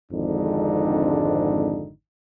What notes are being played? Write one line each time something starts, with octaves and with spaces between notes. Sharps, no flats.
G#1 F2 G#2 D3 D4 D#4